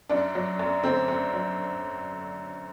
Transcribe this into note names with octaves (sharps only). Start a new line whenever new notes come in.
F#2 D4
F#3
F#2
D3 C4
F#2
F#3